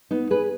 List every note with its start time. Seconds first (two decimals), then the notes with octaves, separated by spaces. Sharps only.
0.11 B3 D#4
0.30 G#4 B4